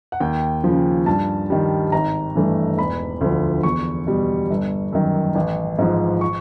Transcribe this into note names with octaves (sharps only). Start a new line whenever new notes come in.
F#5
D#2 G5
C#3 F3
G2 A5
D#3 G3
G#1 A#5
G2 E3 A3
E1 B5
D2 D3 F3
E2 C#6
B2 G3
G1
F#2 D#3
A1
G#2 F3
C#6